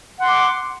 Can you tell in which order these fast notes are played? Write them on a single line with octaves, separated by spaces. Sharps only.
F#5 C6 D6